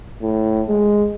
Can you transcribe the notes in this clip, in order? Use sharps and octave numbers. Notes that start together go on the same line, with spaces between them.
A2
G#3